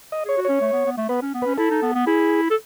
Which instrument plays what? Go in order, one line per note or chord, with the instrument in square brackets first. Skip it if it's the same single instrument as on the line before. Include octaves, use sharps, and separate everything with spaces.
[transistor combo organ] D#5
[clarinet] G#4 [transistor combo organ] C#5
[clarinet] F#4
[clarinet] C#4 [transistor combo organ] C#5
[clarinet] A3
B3
B3
A3
[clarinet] B3 [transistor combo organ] B4
[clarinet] C#4
B3
[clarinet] C#4 [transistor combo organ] B4
[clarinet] E4 [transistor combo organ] A4
[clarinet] D#4
B3
B3
[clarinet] E4 [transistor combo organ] G#4
[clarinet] A4